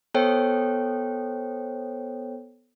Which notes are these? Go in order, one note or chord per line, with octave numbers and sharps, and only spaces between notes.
B3 A4 C5 C#5 G5